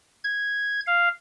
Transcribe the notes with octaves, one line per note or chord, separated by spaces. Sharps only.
G#6
F5